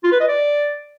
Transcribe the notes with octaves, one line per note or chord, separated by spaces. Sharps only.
F4
B4
D#5
D5